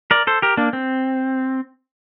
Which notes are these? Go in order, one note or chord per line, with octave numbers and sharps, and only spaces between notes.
A#4 D5
A4 C5
G4 A#4
A#3 D4
C4